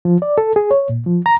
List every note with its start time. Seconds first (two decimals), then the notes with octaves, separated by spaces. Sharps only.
0.05 F3
0.22 D5
0.38 A4
0.56 G#4
0.71 C#5
0.89 A#2
1.06 F3
1.26 A#5